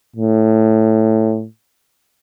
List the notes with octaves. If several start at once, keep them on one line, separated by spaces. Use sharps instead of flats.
A2